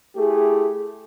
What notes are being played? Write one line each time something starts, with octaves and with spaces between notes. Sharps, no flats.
A3 E4 G4 G#4